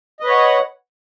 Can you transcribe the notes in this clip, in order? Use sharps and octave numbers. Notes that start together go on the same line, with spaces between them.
B4 C#5 D#5 F#5